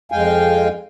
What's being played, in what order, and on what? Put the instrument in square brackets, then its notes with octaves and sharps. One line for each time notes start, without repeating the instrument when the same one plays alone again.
[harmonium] F2 G#3 F5 G5 G#5